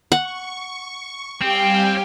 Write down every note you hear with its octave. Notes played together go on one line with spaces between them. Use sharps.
F#5 C#6
G3 C4 G4 F5 G5 G#5